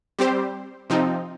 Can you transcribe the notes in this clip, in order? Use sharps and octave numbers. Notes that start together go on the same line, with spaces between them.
G3 C4 G4 C5
C3 F3 C4 D#4